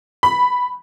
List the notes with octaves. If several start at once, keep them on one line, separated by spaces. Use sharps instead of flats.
B5